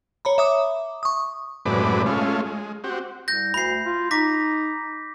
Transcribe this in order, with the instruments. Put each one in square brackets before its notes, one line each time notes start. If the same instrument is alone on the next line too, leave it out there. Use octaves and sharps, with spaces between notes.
[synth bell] C#5 A#5 B5
E5 D6 D#6
C#6 D#6
[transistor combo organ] F#2 A2 C3 G#3 B4 D5
G#3 A3 C#4 F4
G#3
C4 F#4 G4
[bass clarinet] C2 [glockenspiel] G6 A#6
[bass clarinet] D2 [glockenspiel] B5 C7
[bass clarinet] F4
[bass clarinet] D#4 [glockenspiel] D6 A#6 B6